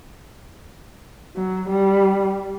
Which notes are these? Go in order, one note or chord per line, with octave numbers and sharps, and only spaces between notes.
F#3
G3